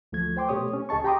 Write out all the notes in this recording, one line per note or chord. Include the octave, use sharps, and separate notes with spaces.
D2 F3 A3 G#6
C5 G5 C6 D6
B2 A3 G4 C#5 D#6
C#4
C#2 G#4 D#5 A5 C#6
G4 G5 A#5 C6 D6 D#6